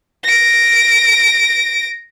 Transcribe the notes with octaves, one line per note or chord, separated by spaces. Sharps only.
A#6 D7